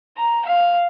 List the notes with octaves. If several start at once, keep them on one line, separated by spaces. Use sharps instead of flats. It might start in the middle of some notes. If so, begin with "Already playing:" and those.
A#5
F5